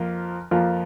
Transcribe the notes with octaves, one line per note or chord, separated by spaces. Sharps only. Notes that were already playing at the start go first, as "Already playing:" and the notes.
Already playing: F2 F3 A#3 F4
F2 F3 A#3 F4